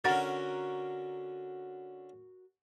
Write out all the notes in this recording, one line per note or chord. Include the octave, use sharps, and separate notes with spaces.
D3 C#4 F#4 A#4 F#5 A6